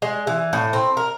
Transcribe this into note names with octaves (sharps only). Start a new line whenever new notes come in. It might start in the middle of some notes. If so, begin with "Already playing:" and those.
G#3
E3
A2
C4
A#4